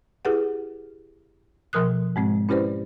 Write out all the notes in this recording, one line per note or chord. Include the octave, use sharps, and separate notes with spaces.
E4 G4 G#4 B4 F#5
B2 F3 A#4 D#6 F#6
G#2 G#3 C4
C#4 E4 G4 B4 C5 D5